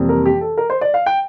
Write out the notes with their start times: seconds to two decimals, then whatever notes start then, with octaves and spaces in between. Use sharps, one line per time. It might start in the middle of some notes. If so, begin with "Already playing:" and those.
Already playing: F2 C3 E3 G3 A#3
0.09 A#4
0.25 G4
0.41 A4
0.57 A#4
0.70 C5
0.81 D5
0.94 F5
1.06 G5